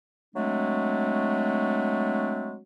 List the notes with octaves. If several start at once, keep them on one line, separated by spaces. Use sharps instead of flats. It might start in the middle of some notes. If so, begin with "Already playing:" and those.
F#3 G#3 A3 C4 D4